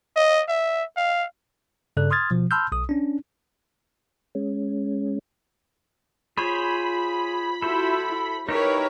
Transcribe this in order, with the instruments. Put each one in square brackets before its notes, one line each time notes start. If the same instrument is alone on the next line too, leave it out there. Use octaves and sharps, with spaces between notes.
[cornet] D#5
E5
F5
[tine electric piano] G2 C#3 A4 D5 F#6
C6 D#6 F6 G#6 A6
B2 F3
A5 B5 C6 E6 F6 G6
B1 D#6
C#4 D4
[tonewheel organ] G#3 C#4
[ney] F4 [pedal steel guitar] G#4 C5 C#5 [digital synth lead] B5
[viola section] E4 F#4 [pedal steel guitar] A4 C5
[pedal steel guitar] D#4 E4 G4 [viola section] A#4 B4 C#5